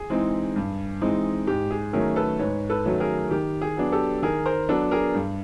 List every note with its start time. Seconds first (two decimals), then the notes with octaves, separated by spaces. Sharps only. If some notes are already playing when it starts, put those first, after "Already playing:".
Already playing: G#4
0.10 E3 G#3 C4 D#4
0.56 G2
1.01 E3 G#3 C4 D#4
1.47 G#2 G4
1.71 G#4
1.93 D#3 F#3 A3 C#4 G#4 A#4
2.16 A4 B4
2.39 G#2 B4 C#5
2.70 A4 B4
2.85 D#3 F#3 A3 C#4
3.00 G#4 A#4
3.31 D#3 G4
3.61 G#4
3.76 F#3 B3 D4
3.92 G4 A4
4.22 D#3 G#4 A#4
4.46 A#4 C5
4.69 F#3 B3 D4 A4 B4
4.91 G#4 A#4
5.14 G2